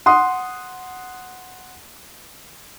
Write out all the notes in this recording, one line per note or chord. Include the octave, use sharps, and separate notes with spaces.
F#5 C6 D#6